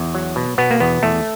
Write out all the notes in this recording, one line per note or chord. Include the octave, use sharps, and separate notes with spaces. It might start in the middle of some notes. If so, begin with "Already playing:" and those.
Already playing: E2
F#3
B2
B2 B3
A#3
E2 B3
E2 A3